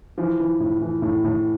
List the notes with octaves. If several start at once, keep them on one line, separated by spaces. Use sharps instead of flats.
E3 F3
E3
A2
E3
A2
A2